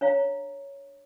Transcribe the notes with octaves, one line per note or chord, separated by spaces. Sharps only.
D4 C#5 F5 A#5